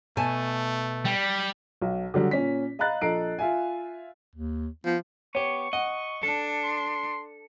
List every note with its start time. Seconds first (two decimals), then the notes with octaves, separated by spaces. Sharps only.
0.17 B2 A3 G#5 A5
1.06 G3
1.82 B1
2.14 D3 F#3 G3
2.31 A#2 C#4 B6
2.79 D#5 F5 A#5 B5 F#6 A6
3.01 A#1 A4 D#5 A#5 C7 D7
3.39 F4 E5 G#5
4.35 D#2
4.85 F3 B3
5.35 B3 G4 C#5 C#6
5.73 D#5 F#5
6.23 D4 A4
6.63 C6